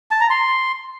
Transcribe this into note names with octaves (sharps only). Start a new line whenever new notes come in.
A5
A#5
C6